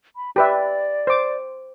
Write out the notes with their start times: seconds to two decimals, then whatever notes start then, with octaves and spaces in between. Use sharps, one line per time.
0.16 B5
0.36 G4 B4 D5 E5
1.07 C5 D6